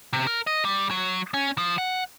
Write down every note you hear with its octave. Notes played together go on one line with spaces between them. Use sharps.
C3
A#4
D#5
G3
F#3
C#4
F3
F#5